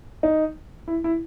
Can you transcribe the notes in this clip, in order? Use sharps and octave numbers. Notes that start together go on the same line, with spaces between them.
D#4
E4
E4